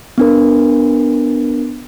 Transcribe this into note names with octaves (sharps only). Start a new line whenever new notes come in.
B3 D4 A#4